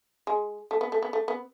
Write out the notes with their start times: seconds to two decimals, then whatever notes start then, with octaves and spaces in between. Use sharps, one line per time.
0.27 G#3
0.71 A3
0.81 B3
0.92 A3
1.02 B3
1.13 A3
1.28 B3